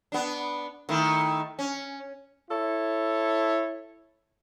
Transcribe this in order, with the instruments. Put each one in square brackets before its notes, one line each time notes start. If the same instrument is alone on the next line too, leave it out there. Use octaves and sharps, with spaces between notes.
[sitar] B3 D4
D#3 A3 E4
C#4
[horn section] E4 A4 C#5